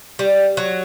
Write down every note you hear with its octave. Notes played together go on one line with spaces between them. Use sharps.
G3
F#3